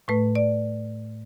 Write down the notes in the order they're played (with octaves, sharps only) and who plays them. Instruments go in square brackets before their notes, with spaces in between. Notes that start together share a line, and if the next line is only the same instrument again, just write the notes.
[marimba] A2 A3 B4
D5